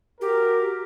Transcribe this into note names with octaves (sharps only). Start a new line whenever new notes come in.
F#4 G4 A#4